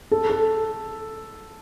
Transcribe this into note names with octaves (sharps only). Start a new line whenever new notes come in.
A4
A4